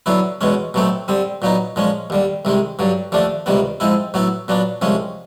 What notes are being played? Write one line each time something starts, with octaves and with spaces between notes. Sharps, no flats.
D3 F#3 B3 E4
E2 B2 G#3 C#4
B2 F#3 A3 C4
D3 G3 C4
A#2 F#3 B3 D#4
A#2 F3 G#3 C#4
D#2 D3 G3
C2 C3 D#3 G#3
G2 D3 F#3
D#2 D3 F3 A3 D4
C#2 C3 D#3 G3 B3
G#2 F3 G#3 C4 E4
A2 F#3 B3 E4
A#2 F#3 B3 D4
C2 C3 F3 G#3 C#4